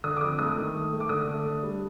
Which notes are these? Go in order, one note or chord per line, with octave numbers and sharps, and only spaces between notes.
D3 D#6
D6
F2 D#6
A3 D#6
D#3
A3
A3
D6
D3 D#6
A3
D4
G3